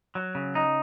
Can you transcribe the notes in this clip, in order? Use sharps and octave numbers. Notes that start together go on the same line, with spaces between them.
F#3
C#3
D#4